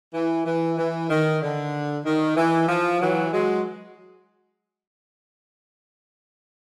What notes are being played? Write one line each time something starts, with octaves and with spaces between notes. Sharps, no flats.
E3
E3
E3
D#3
D3
D#3
E3
F3
E3 F#3
F#3 G#3